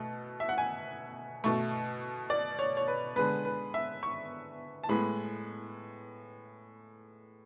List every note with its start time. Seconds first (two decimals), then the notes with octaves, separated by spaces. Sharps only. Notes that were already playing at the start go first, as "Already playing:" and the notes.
Already playing: B2 A3
0.40 E5
0.49 F#5
0.58 G#5
1.44 B2 A3 C#6
2.30 D5
2.59 C#5
2.77 C#5
2.88 B4
3.16 D3 G#3 B3 B4
3.45 B4
3.74 E5
4.03 C#6
4.84 A5
4.89 A2 G#3 B3 B5